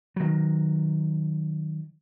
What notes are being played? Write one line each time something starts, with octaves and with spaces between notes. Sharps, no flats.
D#3 F#3